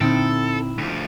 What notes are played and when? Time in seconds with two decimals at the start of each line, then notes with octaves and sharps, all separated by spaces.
0.01 A#2 D3 C4 D#4 E4 A4 G5
0.78 D2 F3